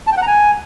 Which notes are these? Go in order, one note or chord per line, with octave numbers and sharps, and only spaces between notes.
A5
G5
F#5
A#5
G#5